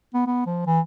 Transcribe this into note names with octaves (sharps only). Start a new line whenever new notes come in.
B3
B3
F3
E3